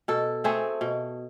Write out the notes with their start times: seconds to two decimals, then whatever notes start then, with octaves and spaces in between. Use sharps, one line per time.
0.08 B2 A4
0.44 A3 C4 G#4
0.81 B2